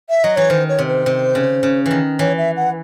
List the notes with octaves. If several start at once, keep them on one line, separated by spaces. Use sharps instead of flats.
E5
F#3 D#5
E3 C#5
D#3 C5
C#5
C3
C5
C3
C#3
C#3
E3
D#3
E3 C#5
E5
F#5